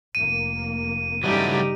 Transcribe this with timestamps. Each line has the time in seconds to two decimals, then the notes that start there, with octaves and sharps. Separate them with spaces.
0.15 F1 A#3 D#7
1.24 G1 C#3 E3 F#3 G3 A3 D#4 G4